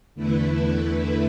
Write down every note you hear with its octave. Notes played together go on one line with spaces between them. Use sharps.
E2 D3 A3 E4 B4